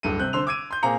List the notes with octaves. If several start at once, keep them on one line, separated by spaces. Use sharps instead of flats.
D1 G2 A4 D#7
C3 C4 F#6 G6
D3 C5 C6 E6 F7
D6 E6 G#6 D7 D#7
C6 G6
A#2 A#3 C4 G#4 A#5 C#7